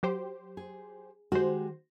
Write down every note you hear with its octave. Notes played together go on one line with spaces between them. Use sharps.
F#3 G4 C5
G#4
D#3 G#3 F#4 G4 C5